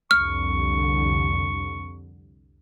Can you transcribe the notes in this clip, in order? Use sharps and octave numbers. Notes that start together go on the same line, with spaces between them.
C2 F2 D3 C#6 F6